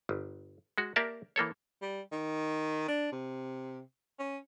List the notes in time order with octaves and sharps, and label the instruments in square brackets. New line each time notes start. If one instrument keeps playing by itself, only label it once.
[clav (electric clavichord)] G1
G#3 F#4
A#3 G4 A#4 D5 E5 A5
E3 A#3 A4 C#5
[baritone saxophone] G3
D#3
D4
C3
C#4